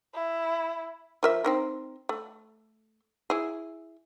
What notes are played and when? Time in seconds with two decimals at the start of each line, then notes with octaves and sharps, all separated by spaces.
0.14 E4
1.23 F3 A#4 E5
1.44 C4 D#4 A#4
2.09 A3
3.30 E4 G#4